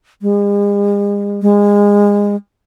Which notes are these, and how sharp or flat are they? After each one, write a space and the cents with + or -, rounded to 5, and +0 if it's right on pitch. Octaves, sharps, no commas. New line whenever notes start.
G#3 -40
G#3 -25